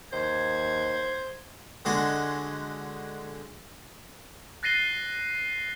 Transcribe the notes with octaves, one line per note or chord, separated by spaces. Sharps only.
D#2 C5 G#6
D3 G#3 F#4 G#4
F#6 A6 A#6 C7 D#7 G7